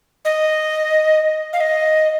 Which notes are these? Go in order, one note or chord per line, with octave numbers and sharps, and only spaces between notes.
D#5
F5
D#5